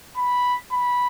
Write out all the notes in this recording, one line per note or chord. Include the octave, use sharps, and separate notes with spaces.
B5
B5